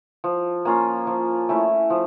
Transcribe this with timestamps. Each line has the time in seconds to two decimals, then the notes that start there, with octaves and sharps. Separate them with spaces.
0.24 F3
0.65 A#3 C#4 F4
1.07 F3
1.49 A3 C#4 E4
1.90 F3